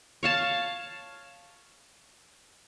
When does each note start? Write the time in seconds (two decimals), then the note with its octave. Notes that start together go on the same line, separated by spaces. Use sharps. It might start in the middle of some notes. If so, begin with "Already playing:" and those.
0.23 C#5 F5 A5